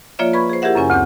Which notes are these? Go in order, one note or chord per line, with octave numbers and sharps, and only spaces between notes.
F3 A#3 F4 C#5 D5 E5
B4 B5 C#6 G#6
G#4 C5
E4 G4 G#4 A#4 E5 F#5
F#2 C#3 C#4 G#5
D2 C4 D6 G6